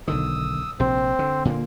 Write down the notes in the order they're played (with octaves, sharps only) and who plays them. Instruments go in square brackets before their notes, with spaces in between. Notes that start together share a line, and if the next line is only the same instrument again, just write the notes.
[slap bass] B1 D3 D#3 [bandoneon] D#6 E6
[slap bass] A#1 C3 [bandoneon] C4 C5
[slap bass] D3
A#2 D3 A#3